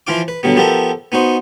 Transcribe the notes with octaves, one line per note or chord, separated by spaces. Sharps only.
E3 F3 F4 F5 D6
B4
B2 D3 F#3 G3 B3
F3 B3 G4 A4 A#4 E5
B3 D#4 F#4 C5